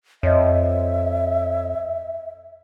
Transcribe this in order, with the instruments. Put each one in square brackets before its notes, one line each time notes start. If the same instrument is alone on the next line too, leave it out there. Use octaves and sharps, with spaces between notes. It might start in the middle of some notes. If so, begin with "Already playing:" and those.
[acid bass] F2 [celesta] C#5 D#5 [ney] E5